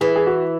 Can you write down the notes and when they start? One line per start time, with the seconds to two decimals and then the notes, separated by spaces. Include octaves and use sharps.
0.01 E3 G#4
0.16 G#4
0.27 F#4